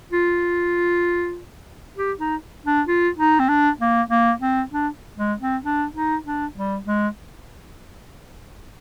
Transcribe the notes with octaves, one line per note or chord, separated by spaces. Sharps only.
F4
G4
D#4
D4
F4
D#4
C4
D4
A#3
A#3
C4
D4
G#3
C4
D4
D#4
D4
G3
G#3